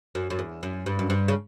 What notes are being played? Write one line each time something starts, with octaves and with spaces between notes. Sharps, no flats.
F#2
F#2
E2
F#2
G2
F#2
G2
C#3